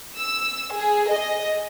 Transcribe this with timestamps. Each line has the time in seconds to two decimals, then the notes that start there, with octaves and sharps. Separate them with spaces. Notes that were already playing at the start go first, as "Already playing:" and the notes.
0.17 E6
0.74 G#4
1.10 D#5